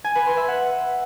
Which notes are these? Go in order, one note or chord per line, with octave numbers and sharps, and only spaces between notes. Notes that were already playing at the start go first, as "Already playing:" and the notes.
G#5
B4
C6
E5
F#5